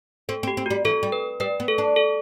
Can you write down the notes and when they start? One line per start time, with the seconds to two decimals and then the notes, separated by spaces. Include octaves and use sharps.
0.29 C4 A4
0.43 C4
0.47 G4
0.57 C4
0.66 G3 F#4
0.85 E3 A4
1.03 G3
1.12 B4
1.40 G3 B4
1.60 B3
1.68 A4
1.78 D4
1.96 A4